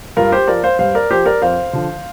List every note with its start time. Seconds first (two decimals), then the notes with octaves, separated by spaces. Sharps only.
0.17 G2 F4 A#4
0.32 G4 C5
0.47 F3 A#4 D5
0.63 C5 F5
0.79 G2 C5 F5
0.95 A#4 D5
1.10 F3 G4 C5
1.26 A#4 D5
1.42 F2 C5 F5
1.73 D3 F3